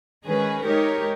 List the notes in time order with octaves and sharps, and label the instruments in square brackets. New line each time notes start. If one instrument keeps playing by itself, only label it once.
[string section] D#3 G#3 C#4 G#4 B4
G#3 D#4 G4 A#4 C#5